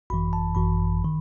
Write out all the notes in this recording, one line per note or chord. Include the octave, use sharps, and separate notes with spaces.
G#1 F#2 E3 B5
A5
G#1 F#2 E3 B5
D#3